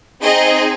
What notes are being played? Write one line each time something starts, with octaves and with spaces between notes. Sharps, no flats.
C4 D#4 G#4 D#5